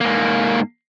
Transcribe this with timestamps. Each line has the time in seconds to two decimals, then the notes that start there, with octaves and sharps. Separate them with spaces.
0.01 G#2 A#3